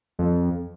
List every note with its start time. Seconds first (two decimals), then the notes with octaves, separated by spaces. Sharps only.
0.19 F2